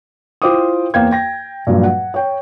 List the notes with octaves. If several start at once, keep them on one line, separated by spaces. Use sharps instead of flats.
E4 F4 C5 G5 D6 D#6
E2 A#3 C5 F5 G5 G#6
G5 A#6
G2 A#2 F3 F#3
F#5
C#5 G5